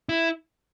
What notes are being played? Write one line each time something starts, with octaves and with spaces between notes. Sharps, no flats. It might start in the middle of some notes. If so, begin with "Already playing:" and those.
E4